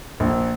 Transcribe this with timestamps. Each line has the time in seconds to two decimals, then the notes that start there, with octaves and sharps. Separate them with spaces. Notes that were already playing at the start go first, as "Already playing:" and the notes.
0.20 A#1